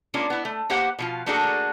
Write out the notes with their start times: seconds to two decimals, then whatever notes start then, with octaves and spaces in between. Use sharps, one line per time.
0.14 G#3 A#3 C#4 D4 F4
0.30 B3 E4
0.45 A3
0.70 A#3 B3 G4 C5 F#5
0.99 B2 F3 F4
1.26 A3 A#3 D4 F#4 G#4 A4